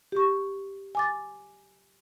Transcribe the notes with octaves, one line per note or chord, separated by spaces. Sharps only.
G4 C#6
G#5 D6 A6